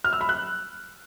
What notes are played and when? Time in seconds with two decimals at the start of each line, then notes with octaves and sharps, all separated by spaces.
0.04 F6
0.13 E6
0.21 B5
0.29 F#6